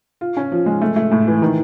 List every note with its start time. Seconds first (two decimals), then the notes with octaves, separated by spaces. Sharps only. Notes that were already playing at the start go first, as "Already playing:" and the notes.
0.21 F4
0.37 C#4
0.52 F3
0.66 G#3
0.81 A3
0.96 A3
1.11 A2
1.27 E3
1.42 D#3